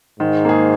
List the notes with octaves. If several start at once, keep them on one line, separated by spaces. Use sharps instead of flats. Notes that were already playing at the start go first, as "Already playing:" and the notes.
G#2 D#3
A#3 G#4